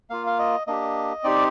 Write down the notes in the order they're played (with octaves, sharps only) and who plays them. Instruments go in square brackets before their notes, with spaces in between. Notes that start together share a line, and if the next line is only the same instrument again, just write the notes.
[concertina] A#3 F4 F5
F5
D#5
A#3 D4 G4 D#5
C4 D#4 G4 D5